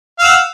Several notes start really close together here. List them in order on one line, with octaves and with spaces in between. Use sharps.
F5 E6 F#5